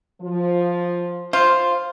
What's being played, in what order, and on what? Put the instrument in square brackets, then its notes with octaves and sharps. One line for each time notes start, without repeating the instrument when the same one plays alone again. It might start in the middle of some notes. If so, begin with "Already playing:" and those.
[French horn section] F3
[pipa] F4 [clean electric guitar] C5